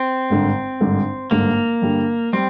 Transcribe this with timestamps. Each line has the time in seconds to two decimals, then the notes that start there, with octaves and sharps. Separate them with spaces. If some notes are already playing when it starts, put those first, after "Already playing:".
Already playing: C4
0.30 G#1 G2 D3
0.80 G#1 G2 D3
1.31 G#1 G2 D3 A#3
1.82 G2 D3 G3
2.33 G3 C4